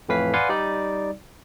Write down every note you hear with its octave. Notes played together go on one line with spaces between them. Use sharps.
F2 A2 E3 B4 F5 B6
B4 D5 F5 F#5 G#5 C6
G3 D#4 D5